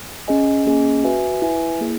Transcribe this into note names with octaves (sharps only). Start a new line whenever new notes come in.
C#4 G#4 D#5 G#5
A#3 C#4 G#4 D#5 G#5
F#4 B4 E5 G#5
E4 B4 E5 G#5
A#3 E4 G#4